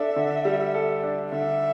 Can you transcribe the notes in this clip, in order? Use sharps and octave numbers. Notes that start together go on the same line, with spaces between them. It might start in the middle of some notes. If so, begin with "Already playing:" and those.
Already playing: D4 A4 E5
D3
G3
A4
D4
D3 E5